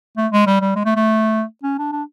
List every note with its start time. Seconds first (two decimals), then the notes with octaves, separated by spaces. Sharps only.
0.17 A3
0.32 G#3
0.47 G3
0.61 G3
0.76 G#3
0.85 A3
0.96 A3
1.63 C#4
1.78 D4
1.92 D4